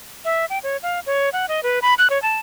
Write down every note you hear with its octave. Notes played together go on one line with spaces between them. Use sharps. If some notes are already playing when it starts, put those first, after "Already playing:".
E5
G5
C#5
F5
C#5
F#5
D#5
B4
B5
F#6
C#5
A5